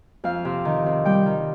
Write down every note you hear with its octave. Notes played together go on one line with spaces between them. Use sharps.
F2 F5
C3
D#3
C3
G3 G5
D#3